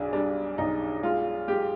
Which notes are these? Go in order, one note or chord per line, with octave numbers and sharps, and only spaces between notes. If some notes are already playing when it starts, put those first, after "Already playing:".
Already playing: B1 D4 G#4
G3 D4
B1 D#4
G#3 F4
G#3 G4